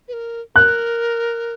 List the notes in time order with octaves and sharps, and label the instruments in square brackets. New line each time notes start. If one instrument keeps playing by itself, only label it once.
[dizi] B4
A#4
[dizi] A#4 [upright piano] F#6